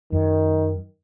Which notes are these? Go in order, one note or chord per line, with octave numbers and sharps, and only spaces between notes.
F#2 D#3